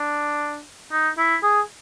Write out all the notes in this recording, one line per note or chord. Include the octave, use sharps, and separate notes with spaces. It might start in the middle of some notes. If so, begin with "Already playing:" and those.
Already playing: D4
D#4
E4
G#4